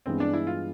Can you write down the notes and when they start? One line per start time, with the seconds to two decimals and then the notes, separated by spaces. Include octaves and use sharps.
0.06 G2 E3 G#3 B3 C4
0.20 D4
0.33 E4
0.47 F4